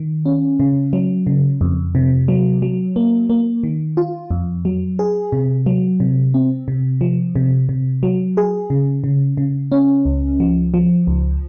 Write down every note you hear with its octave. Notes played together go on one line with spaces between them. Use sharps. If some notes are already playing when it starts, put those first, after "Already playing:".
Already playing: D#3
C#4
C#3
F#3
C#3
F2
C3
F#3
F#3
A#3
A#3
D#3
F4
F2
F#3
G#4
C3
F#3
C3
C4
C3
F3
C3
C3
F#3
G#4
C#3
C#3
C#3
C#4
C#2
F3
F3
C#2